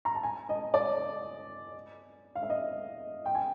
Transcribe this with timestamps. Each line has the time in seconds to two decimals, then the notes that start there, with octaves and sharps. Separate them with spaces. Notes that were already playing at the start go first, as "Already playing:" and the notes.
0.05 A#5
0.15 A5
0.23 G#5
0.49 D#5
0.74 D5
2.35 F5
2.43 E5
2.50 D#5
3.26 G5
3.35 G#5